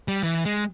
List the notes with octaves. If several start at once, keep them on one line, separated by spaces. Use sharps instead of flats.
G3
E3
G#3